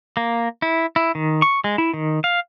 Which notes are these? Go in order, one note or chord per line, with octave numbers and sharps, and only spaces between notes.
A#3
E4
E4
D#3
C#6
G#3
E4
D#3
F5